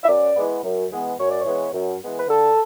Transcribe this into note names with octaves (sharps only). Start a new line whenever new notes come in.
E5
F#2 D5
E3 G#3 B3
F#2
E3 G#3 B3
F#2 C#5
D5
C#5
E3 G#3 B3
F#2
E3 G#3 B3
B4
D3 A4